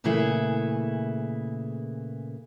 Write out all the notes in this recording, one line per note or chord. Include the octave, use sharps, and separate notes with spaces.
A#2 C#3 E3 A3 E4 G#4